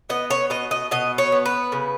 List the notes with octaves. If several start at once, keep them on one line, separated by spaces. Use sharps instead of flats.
B3 D#5
C#5
B2 D#5
D#5
B2 D#5
C#5
B3
B4
C#3